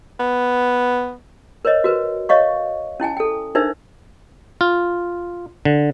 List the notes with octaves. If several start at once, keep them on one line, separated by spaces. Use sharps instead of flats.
B3
A#4 C5 C#5 D#5
F#4 A#4 B4
C#5 D#5 F5 C#6
C#4 E4 G5 G#5
A4 G5
D4 D#4 A#4 C5 E5
F4
D3